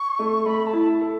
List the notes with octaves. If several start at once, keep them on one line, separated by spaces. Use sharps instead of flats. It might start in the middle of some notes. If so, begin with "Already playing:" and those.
Already playing: C#6
A3
A3 B5
A5
E4
A4